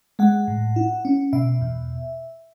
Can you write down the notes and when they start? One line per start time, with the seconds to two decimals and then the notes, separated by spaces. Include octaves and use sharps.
0.19 G#3 F#5
0.48 A2
0.76 E4
1.05 C#4
1.33 B2 E5
1.61 E2